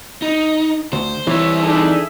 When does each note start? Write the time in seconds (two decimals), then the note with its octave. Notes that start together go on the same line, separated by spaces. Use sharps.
0.22 D#4
0.93 D2 C5
1.27 E3 G3 C4 C#5 E5
1.63 D4 D#4 G#4 A4 E5